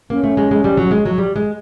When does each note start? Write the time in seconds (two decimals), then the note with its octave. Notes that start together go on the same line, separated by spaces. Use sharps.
0.10 A#3 C#4
0.24 A3
0.37 G#3
0.51 G#3
0.64 G3
0.77 F#3
0.91 G#3
1.05 F#3
1.18 G3
1.36 G#3